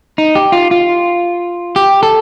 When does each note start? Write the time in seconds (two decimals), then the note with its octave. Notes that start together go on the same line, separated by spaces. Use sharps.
0.18 D#4
0.35 G4
0.52 F4
0.71 F4
1.76 G4
2.03 A4